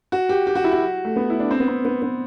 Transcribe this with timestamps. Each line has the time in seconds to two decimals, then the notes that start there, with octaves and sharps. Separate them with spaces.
0.12 F#4
0.29 G4
0.47 G4
0.55 F#4
0.64 E4
0.72 F#4
1.05 A3
1.16 B3
1.30 E4
1.40 D4
1.51 C4
1.60 B3
1.68 C4
1.85 B3
2.02 B3